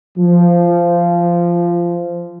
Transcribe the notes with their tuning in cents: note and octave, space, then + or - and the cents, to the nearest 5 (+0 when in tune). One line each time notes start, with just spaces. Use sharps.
F3 -15